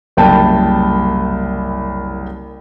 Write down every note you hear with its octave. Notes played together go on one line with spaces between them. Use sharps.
F#1 C2 G5 A5